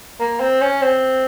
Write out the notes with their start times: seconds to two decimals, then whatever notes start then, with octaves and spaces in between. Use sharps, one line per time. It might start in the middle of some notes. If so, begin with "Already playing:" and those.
0.19 A#3
0.40 C4
0.61 C#4
0.82 C4